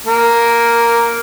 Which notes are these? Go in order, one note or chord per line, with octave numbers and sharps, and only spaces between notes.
A#3